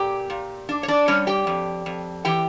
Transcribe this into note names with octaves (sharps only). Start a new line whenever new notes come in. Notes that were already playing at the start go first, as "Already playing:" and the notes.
Already playing: A#2 G4 G5
A#2
D4
C#5
D4 D5
G3 C#4 C#5
G4 G5
F2
F2
E3 G4 G5